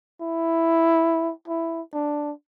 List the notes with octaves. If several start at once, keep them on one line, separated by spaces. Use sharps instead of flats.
E4
E4
D4